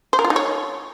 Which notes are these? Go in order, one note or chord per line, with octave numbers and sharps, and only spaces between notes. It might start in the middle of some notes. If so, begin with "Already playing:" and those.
C5
A#4
F4
D#4
C#5